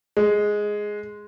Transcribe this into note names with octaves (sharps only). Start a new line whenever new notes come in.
G#3